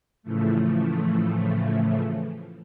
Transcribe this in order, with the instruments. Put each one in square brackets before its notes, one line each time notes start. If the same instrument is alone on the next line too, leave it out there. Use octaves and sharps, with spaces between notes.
[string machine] A2 C#3 E3 F3 A3